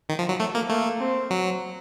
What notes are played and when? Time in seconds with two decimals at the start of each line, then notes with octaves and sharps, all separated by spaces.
0.09 D#3
0.19 F3
0.29 F#3
0.40 A3
0.55 A#3
0.70 A3 A#3
1.00 C4
1.30 F#3